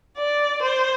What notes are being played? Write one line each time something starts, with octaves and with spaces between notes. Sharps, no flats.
D5
C5